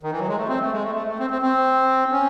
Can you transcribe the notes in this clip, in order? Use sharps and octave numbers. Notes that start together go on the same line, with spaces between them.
D#3
E3
F#3
G#3
A3
C4
A3
G#3
A3
A3
A3
C4
C4
C4
C#4